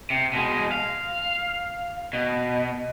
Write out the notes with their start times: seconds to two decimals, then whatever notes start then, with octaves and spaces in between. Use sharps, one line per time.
0.10 C3
0.33 B2 G#3
0.72 F5
2.13 B2